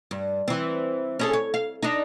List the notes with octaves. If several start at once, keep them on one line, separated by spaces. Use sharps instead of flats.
G2
E3 C4
C#4 G#4 A4
C#5
F5
D4 D#4